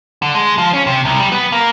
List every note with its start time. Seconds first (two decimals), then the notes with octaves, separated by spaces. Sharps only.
0.22 D3
0.35 G#3
0.58 F3
0.74 C#4
0.87 C3
1.05 C2
1.20 G3
1.32 B3
1.52 A#3